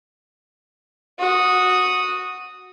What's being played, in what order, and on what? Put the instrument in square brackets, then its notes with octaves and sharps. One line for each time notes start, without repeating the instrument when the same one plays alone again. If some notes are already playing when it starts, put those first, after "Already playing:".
[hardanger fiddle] F#4 D#6